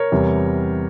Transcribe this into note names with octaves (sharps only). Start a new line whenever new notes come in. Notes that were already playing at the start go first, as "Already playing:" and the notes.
Already playing: A#4 C#5
E2 C3 G3